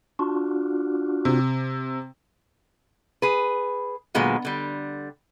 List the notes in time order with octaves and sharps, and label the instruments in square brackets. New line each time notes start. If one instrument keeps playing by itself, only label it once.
[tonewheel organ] D4 F4 F#4
[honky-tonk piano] C3
[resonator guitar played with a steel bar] G#4 B4
A#2 D3 F#3 G#3 B3
D3 G3